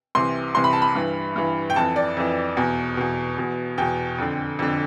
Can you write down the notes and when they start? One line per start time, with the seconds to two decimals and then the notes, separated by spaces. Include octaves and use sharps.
0.15 C2 C3 E3 C6
0.55 C2 C3 E3 C6
0.64 B5
0.73 A5
0.82 B5
0.95 G2 E3
1.36 G2 E3
1.70 G5
1.76 F2 E3 A5
1.96 D5
2.17 F2 E3
2.57 E2 B2
2.97 E2 B2
3.38 E2 B2
3.78 E2 B2 G5
4.18 F2 D3
4.59 F2 D3